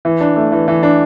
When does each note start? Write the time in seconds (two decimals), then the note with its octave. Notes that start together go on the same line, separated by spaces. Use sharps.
0.05 E3
0.21 D4
0.36 A3
0.52 E3
0.68 E3
0.83 D4